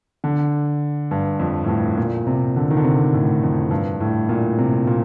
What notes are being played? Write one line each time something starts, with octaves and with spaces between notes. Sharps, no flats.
D3
G2
F2
A2
G2
A#2
C3
D3
D#3
D3
C3
A2
F2
G2
A2
A#2
C3
A#2